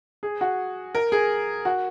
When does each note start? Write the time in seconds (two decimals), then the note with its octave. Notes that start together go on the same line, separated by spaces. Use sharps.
0.23 G#4
0.41 F#4
0.95 A#4
1.12 G#4
1.65 F#4